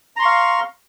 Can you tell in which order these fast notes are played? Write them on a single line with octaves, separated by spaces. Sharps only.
A#5 C6 C#6 F5